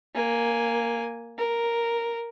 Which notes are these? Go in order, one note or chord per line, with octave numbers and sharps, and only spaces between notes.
A#3 G#5
A#4